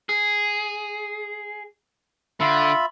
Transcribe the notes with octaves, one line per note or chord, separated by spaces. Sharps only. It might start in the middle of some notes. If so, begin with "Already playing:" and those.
G#4
D3 F4 E5 B5